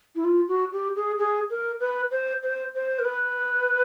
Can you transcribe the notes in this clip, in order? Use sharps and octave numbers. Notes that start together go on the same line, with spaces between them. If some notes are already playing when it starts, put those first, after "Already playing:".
E4
F4
F#4
G4
G#4
G#4
A#4
B4
C5
C5
C5
A#4
B4